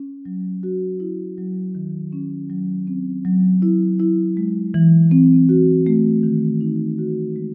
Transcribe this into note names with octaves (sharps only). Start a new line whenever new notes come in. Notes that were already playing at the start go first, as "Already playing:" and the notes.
Already playing: C#4
F#3
F#4
E4
F#3
D#3
C#4
F#3
C4
F#3
E4
E4
G#3
E3
C4
F#4
A3
D#3
D#4
F#4
G#3